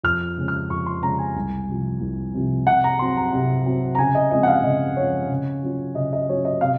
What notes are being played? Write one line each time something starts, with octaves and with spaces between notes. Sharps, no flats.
F2 F6
C#3 G#3 C#4
F6
F2 C#6
C6
C#3 G#3 C#4 A#5
G#5
C2
C3 F3
C2
C3 F3
C3 F#5
A#5
F#3 C4 C6
A#5
C3
F#3 C4
A#5
C#3 G#5
D#5
F3 G#3 C4 D#5
F#5
F5
C#3 D#5
F3 G#3 C4 C#5
C#3
F#3 C#4 F4
C#3 D#5
D#5
F#3 C#4 F4 C#5
D#5
C3 F5